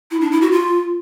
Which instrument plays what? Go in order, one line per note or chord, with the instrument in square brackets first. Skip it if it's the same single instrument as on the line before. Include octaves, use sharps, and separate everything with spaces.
[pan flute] E4
D4
E4
F#4
F4